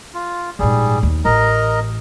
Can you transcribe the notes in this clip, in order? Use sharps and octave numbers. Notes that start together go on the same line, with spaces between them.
F4
A#1 G#2 G3 G#4
D#2
A1 A#4 D#5 A#5